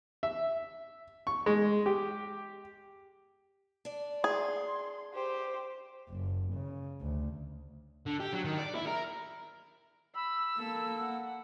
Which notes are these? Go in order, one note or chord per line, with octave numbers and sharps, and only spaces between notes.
E5
C#6
G#3
G4
D4 D5
G#4 C6
G4 C5
F#1
C#3
D2
D3
G4
F#3
D#3
D5
E4
A#4
B5 E6
A#3 A4
F#5